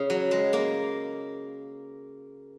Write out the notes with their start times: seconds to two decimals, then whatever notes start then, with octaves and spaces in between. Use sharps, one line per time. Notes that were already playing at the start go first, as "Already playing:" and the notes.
Already playing: C#3
0.10 F#3
0.31 G#3
0.53 A#3